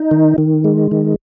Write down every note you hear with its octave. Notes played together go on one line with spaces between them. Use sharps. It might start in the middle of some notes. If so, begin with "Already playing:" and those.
Already playing: D#4
D#3
D#3
G#3
D#3